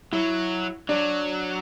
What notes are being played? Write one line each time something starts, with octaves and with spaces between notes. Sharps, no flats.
F#3 E4
F#3 D4